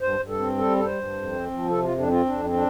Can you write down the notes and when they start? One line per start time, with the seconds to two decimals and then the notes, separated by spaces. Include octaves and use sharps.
0.01 G2 C5
0.19 G2
0.29 A4
0.39 C4
0.58 G3 A4
0.76 G2 A4
0.85 C5
0.94 G2
1.13 F2
1.32 C4
1.51 F3
1.69 C3 A4
1.84 F4
1.89 F2
1.98 D4
2.07 C4 F4
2.26 F2 D4
2.45 C4
2.54 D4